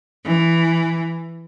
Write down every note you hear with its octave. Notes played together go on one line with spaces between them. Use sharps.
E3